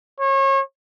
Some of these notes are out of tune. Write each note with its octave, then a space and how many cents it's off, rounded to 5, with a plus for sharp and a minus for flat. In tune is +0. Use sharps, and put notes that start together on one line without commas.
C#5 -35